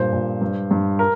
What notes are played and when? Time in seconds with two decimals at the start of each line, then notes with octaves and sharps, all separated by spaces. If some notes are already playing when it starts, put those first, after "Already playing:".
Already playing: G2 A#2 C5
0.12 A#2
0.41 G2
0.71 G2
0.99 A#4